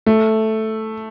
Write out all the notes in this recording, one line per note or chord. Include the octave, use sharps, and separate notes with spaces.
A3